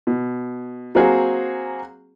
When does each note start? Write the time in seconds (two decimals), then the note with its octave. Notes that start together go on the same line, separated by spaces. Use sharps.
0.07 B2
0.95 F#3 A#3 C4 F#4 G#4